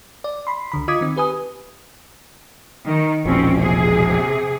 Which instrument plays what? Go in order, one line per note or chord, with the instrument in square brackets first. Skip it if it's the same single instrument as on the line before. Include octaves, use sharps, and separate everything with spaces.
[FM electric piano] D5
B5 C6
C#2 D3 B5
F4 D#5 D6 D#6 G#6 B6
D#3 C4
G4 B4 G#5 D#6
[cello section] D#3
[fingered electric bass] E1 A#1 F3 [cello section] C4 C#4
[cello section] C3 G#4